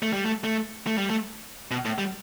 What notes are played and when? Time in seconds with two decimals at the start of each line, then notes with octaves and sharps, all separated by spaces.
0.02 A3
0.13 G3
0.25 A3
0.44 A3
0.87 A3
0.98 G3
1.10 A3
1.71 B2
1.85 A2
1.98 G3